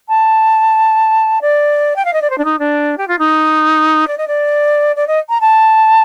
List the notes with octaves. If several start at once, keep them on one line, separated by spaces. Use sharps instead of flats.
A5
D5
G5
F5
D#5
D5
C5
D4
D#4
D4
G4
F4
D#4
D5
D#5
D5
D5
D#5
A#5
A5